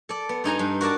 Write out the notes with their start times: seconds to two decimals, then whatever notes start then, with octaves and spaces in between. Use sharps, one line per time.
0.09 A4 D5
0.29 B3
0.44 G2 D#4 G#5 A#5
0.59 G2
0.81 F#4 A#4 D5 A5